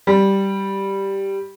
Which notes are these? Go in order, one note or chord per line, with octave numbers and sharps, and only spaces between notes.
G3